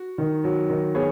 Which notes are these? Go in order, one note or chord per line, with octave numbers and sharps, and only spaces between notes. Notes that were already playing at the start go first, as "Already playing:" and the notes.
Already playing: F#4
D#3
F#3
D#3
B3 G#4 C#5